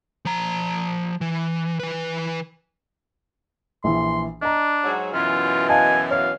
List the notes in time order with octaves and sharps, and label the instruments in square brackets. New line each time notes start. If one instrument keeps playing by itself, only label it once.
[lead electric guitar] F3 A#5
E3
E3 B4
[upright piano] A#1 E3 [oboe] C6
[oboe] D4 [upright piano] D#5 A#5
[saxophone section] G#2 F#3
[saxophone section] F#2 B2 E3 [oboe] F4
[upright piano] D#5 F5 A5 [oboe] G#5
[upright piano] C#5 [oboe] F5